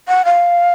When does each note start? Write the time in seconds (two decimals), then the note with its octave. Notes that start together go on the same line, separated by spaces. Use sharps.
0.08 F#5
0.25 F5